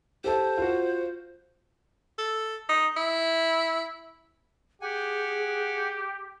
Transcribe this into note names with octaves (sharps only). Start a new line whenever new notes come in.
G4 A4 C5 A5
F4 F#4
A4
D#4
E4
G4 G#4 F#5 G#5